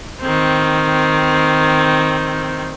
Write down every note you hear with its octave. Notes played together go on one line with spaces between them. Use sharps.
D#3 C4